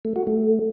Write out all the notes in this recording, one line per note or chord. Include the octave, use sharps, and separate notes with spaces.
A3
F#4
A3